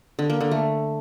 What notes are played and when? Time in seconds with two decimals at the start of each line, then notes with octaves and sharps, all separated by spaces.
0.19 D3
0.30 A#3
0.41 D3
0.51 A3